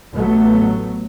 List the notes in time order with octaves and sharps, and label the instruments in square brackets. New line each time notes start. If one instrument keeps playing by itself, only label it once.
[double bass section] A1 F#3 A3 B3